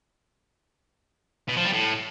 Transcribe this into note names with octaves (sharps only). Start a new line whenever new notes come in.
B2
F3
G3
A2